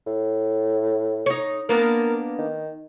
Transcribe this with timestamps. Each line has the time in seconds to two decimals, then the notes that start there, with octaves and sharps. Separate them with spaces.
0.07 A2
1.26 D#4 C#5
1.69 A#3 B3 D4 A#4
2.39 D#3